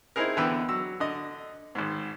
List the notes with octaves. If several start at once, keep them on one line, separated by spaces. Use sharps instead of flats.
C4 D#4 E4 G#4 A#4
D3 E3 B3 B4 G5 E6
F#3 E6
D3 D#5
G#1 G#2